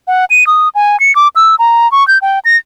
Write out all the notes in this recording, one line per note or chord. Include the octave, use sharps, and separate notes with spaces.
F#5
D#7
D#6
G#5
C#7
D6
E6
A#5
C#6
G6
G5
A#6